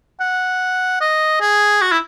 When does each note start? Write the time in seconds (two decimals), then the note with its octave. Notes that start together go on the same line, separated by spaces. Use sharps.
0.20 F#5
1.01 D#5
1.41 G#4
1.82 F#4
1.92 E4